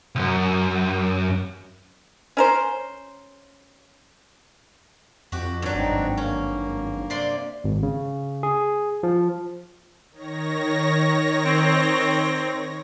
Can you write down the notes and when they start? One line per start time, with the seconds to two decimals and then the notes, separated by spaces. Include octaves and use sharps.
0.15 C2 F#2
2.37 C#4 A#4 C5
5.32 F2 F#4 G4
5.62 G2 D#3 F#3 D4
5.75 G#1 C4 D4 D#4
6.17 A#3 C#4
7.10 C3 D5 C6
7.64 G#1
7.83 C#3
8.43 G#4
9.03 F3
10.12 D#3 C#5 A#6
11.45 C4